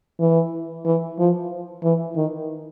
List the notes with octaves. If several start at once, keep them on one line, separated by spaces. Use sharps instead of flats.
E3
E3
F3
E3
D#3